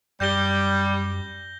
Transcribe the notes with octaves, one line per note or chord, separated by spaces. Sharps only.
F#2 G3 G6 A#6 G7